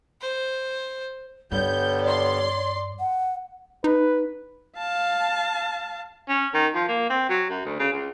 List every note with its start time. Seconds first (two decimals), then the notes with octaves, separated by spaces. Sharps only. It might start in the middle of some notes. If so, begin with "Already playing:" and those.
0.21 C5
1.51 G2 D3 G3 B3 C#5 G6
2.03 D5 C6
3.00 F#5
3.84 D#4 B4
4.77 F5 A5
6.29 C#4
6.54 D#3
6.75 F3
6.88 A#3
7.10 C4
7.30 F#3
7.50 F#2
7.65 D2
7.79 C#3
7.93 C#2